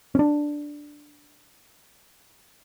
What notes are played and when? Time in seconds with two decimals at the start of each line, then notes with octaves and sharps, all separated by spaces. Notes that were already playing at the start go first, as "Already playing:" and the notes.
0.15 C#4 D4